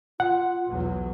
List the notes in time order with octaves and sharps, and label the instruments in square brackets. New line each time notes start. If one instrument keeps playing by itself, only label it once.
[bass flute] F4 [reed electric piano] F#5
[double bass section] B1 E2 F#3